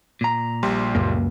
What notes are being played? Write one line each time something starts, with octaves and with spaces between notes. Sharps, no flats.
A#2 A#5
A#1 G3 C6
C#2 F#2 A#3